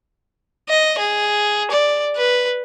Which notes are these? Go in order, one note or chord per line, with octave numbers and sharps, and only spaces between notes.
D#5
G#4
D5
B4